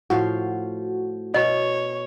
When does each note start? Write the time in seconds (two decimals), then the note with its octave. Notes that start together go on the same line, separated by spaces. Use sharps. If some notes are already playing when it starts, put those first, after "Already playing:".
0.10 A2 F3 F#4 F5
1.34 B2 C#5 D#5